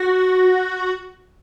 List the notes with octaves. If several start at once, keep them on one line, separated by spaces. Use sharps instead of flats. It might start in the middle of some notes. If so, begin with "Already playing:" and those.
Already playing: F#4